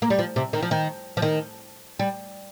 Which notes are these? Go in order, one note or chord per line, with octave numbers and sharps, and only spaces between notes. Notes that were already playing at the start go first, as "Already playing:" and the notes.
A#3
G3
F3
C3
D#3
F3
D#3
F3
D#3
G3